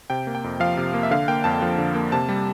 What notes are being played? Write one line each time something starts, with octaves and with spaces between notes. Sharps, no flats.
C3 G5
A#3
G5
F2
F3 F5
C3
A#3
E5
D3 F5
A#3 G5
F2 A5
F3
D3
A#3
C3 A5
G3